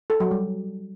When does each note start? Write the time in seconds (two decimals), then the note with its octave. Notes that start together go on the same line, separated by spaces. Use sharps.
0.10 A4
0.20 F#3
0.31 G3